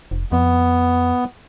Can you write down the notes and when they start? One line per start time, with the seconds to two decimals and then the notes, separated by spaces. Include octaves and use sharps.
0.11 F1
0.32 F2 B3